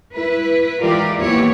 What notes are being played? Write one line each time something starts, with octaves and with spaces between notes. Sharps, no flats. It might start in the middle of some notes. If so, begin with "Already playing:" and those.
E4 B4
E3 G#3 F4 G4 A#4 D5
D#2 E3 B3 E4 G4 C#5